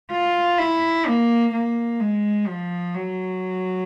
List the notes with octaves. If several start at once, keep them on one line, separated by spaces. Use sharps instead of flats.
F4
E4
A#3
A#3
G#3
F3
F#3